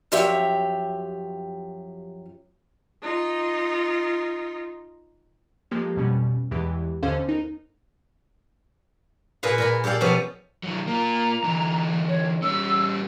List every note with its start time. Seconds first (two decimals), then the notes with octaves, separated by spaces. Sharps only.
0.12 F#2 F3 G4 C#5 E5 G5
3.02 D#4 F4
5.71 F3 G#3 A#3 G4 A4
5.96 F2 B2 G3 C#4
6.51 E2 E3 G#3 G4
7.03 D#2 D3 C#4 A4 C5 F5
7.27 B3 D#4 A#4
9.43 A#2 G#4 B4 F5
9.58 A#2 A#4 B5
9.84 G4 A4 D5 F5 G5
10.01 B2 F3 B3 C#4 G4
10.63 D#3 F#3
10.87 A#3 F4 A#5
11.44 D3 E3
12.08 C#5
12.42 G3 C#4 E6